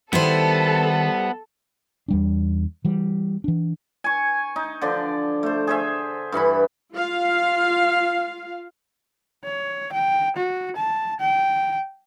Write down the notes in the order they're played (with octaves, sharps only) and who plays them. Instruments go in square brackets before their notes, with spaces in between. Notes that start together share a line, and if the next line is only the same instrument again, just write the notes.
[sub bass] D#3 [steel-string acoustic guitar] G3 E4 C5 [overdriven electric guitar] B3 [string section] A4
[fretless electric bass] E2 G3 D4
E3 G3
E3 D4
[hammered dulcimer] G#5 C#6
D#4
D3 F3 D5
A3 C5
G#4 C5 E5
G2 E3 F#5 B5
[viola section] F4 F5
[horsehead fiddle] C#5
G5
F#4
A5
G5